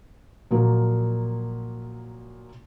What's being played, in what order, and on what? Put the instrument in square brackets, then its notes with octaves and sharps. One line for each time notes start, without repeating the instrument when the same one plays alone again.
[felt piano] A#2 F3 F#3 A#3